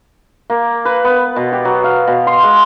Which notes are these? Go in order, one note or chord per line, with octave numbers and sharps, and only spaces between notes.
A#3
B4
B3
B2
G4
F#3
F5
B2
C6
G#3